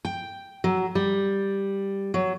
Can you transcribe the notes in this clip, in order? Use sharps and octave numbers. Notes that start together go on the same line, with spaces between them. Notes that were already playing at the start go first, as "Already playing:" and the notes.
G5
F#3
G3
F#3